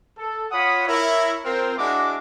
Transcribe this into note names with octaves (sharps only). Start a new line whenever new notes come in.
A4
F4 C#5 F#5 B5 D#6
E4 A#4 C#5
C4 F4 A#4
G#3 D4 E4 F#4 F#5 D6